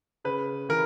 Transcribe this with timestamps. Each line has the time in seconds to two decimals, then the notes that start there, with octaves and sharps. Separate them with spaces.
0.24 C#3 B4
0.69 E3 A#4